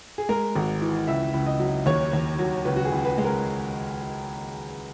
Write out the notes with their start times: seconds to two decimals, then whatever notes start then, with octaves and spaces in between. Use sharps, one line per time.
0.18 G#4
0.29 G#3 A#4
0.56 G#1
0.81 E3
1.08 C#2 E5
1.34 C#2
1.46 D#5
1.60 F#3
1.86 D#2 C#5
2.13 D#2
2.39 F#3
2.65 C#2 B4
2.76 F#4
2.85 G#4
2.92 C#2
3.05 B4
3.18 G#3
3.24 A#4